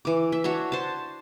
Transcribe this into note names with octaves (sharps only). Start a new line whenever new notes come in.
E3 D6
E5
D4 F#4 C#5 E5
C5 A5